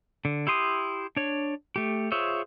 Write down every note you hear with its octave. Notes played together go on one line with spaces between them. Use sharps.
D3
E4 G4 C6 D#6
D4 C#5
A3 G4
F4 G#4 C5 C#5 E5